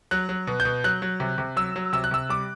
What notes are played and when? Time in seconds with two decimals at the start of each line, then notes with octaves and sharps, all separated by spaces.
0.11 F#3 F#6
0.29 F#3
0.47 B2
0.60 G6
0.65 B2
0.84 F#3 F#6
1.02 F#3
1.20 C3
1.38 C3
1.56 F#3 E6
1.76 F#3
1.93 C3 E6
2.04 F#6
2.11 C3 E6
2.29 G3 D6